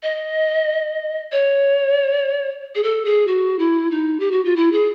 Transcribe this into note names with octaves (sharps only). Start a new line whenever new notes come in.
D#5
C#5
G#4
A4
G#4
F#4
E4
D#4
G4
F#4
F4
E4
G#4